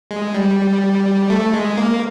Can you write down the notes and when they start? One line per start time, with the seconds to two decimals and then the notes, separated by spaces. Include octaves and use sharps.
0.11 G#3
0.34 G3
1.30 A3
1.54 G#3
1.78 A#3